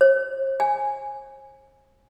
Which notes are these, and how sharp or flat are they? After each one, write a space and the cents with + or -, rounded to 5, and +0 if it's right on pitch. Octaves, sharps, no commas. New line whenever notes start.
C5 +45
G#5 -5